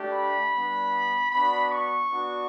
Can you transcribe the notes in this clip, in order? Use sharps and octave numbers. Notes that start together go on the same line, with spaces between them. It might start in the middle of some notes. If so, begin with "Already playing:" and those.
Already playing: A3 D4 G4
B5
G3 B3 D4
B3 D4 F#4 B5
C#6
B3 D4 F#4